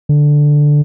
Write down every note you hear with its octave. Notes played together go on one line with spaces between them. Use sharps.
D3